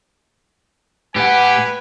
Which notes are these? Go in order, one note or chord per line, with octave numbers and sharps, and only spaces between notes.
A2 G4 B4 F#5 G#5